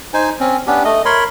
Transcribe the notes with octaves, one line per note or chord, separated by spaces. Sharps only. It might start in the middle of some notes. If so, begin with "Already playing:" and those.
D#4 C5 G#5
C4 C#4
B3 C#4 D4 G4
A3 D#5
A#4 C#5 B5 C6